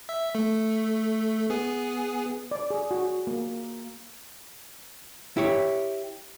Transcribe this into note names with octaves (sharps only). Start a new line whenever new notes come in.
E5
A3
B3 G#4
D5
G#4
F#4
A#3
E4 G4 C#5